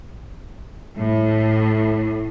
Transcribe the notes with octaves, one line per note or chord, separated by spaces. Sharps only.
A2